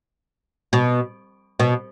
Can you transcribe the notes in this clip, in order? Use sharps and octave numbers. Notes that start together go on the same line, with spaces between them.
B2
B2